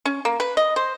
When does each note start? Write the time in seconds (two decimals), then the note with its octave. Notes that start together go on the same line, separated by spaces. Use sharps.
0.05 C#4
0.25 A#3
0.40 B4
0.57 D#5
0.76 C5